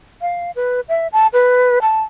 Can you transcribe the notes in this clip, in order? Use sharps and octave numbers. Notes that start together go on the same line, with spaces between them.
F5
B4
E5
A5
B4
A5